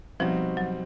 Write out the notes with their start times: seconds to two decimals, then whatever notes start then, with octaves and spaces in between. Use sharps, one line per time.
0.20 B2 F3 G3 C4 D#4 F#4
0.57 F#3